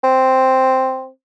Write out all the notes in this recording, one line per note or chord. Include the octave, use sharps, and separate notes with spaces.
C4